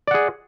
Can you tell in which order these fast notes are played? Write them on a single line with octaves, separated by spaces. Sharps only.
D5 F#5 G#4